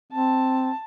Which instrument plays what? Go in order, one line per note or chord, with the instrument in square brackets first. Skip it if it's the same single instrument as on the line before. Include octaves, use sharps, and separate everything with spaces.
[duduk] C4 [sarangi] A5